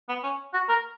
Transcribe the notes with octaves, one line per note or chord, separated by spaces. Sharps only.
B3
C#4
F#4
A#4